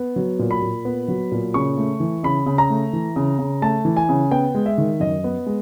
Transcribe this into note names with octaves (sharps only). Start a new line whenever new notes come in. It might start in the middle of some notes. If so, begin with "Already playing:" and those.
Already playing: B3
F#3
A#2
B5
A#2
B3
F#3
A#2
C#3 C#6
A3
E3
C#3 B5
C#3
A#5
A3
E3
C#3
C#3
A3 A5
E3
G#5
C#3
B3 G5
G#3
E5
D#3
F#2 D#5
B3
G#3